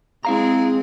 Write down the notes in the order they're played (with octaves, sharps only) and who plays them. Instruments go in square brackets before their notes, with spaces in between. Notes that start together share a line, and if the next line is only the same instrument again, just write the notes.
[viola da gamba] G#3 C4 G#4 [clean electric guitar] E4 F5 A#5